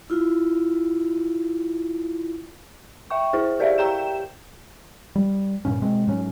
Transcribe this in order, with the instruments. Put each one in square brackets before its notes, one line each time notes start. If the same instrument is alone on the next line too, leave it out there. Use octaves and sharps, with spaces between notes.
[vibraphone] E4 F4
[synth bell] E5 G5 C#6
E4 G#4 C5
G4 A#4 D5 E5 F5
G4 G5 A#5 G6 E7
[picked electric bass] G3
G2 A#2 C#3 C#4
B2 G#3 C4
G#2 F#3 C#4